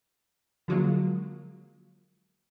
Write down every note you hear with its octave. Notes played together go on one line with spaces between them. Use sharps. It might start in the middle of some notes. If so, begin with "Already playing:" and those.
D3 F3 F#3 G#3 A#3 F4